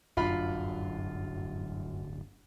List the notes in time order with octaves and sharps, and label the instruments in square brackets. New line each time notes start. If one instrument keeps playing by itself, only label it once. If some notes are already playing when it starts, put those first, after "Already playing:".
[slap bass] D1 G1 D4 [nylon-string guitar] F#2 [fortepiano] F4 F5 B5